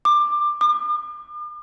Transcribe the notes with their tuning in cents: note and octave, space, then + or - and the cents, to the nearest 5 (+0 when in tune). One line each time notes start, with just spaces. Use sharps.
D6 +20
D6 +45